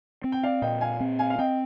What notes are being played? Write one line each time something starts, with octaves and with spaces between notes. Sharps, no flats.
C4
G5
D5 F5
A#2 D#5 G5
F5 G#5
C4
F5 G#5
F5
C4 D#5 G5